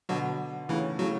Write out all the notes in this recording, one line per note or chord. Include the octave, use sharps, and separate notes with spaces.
B2 D3 F#3 F#4
A2 C#3 E3 E4
A2 C#3 F#3 F#4